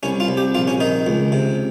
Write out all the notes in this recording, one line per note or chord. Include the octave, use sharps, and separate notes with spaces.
C2 C#4
F4
C2
G4
A#1 F4
C#4
D#3 D#4
C#2
C3